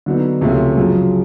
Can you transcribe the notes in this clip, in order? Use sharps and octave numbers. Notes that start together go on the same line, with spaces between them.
D3 F#3 B3 D#4
C#2 C3 F3 A3 C#4
F#2 C#3 F3